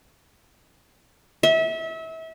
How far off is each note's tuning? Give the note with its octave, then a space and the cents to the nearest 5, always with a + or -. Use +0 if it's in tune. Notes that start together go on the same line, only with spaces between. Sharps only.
E5 -30